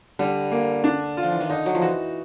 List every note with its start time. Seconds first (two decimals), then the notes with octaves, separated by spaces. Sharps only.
0.19 D3 G3
0.52 A#3
0.84 D4
1.17 F4
1.23 F3
1.32 E3
1.41 D#3
1.50 D3 D#4
1.66 F#3
1.75 F3
1.82 E3 F#4